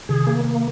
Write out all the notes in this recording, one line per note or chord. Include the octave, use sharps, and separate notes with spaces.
C3 D#3 G#4
A#3
A#3